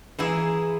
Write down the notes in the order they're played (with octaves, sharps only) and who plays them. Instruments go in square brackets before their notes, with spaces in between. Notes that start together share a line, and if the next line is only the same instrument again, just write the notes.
[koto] E3 A#3 E4 G#4